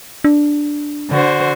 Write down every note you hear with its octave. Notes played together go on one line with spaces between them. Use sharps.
D4
D3 F#4 C5